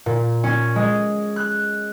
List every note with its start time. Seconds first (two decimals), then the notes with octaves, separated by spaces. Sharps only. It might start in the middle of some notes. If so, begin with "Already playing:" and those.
0.06 A#2
0.44 C#4
0.76 G#3
1.36 F#6